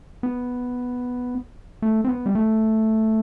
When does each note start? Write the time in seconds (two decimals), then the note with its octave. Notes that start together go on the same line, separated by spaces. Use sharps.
0.23 B3
1.82 A3
2.05 C4
2.09 B3
2.26 G3
2.35 A3